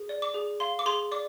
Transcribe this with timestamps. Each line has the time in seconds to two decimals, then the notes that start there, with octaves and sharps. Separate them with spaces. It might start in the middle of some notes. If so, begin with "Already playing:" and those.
Already playing: G#4
0.09 D5
0.22 D6
0.34 G#4
0.60 F5 C6
0.79 D6
0.86 G#4 C6
1.12 D5 D6